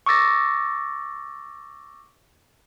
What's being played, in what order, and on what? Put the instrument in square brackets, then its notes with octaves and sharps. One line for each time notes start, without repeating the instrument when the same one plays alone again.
[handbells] C#6 D6 E6 A6 A#6